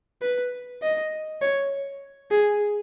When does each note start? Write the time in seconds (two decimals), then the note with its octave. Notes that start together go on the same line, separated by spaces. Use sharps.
0.22 B4
0.82 D#5
1.42 C#5
2.31 G#4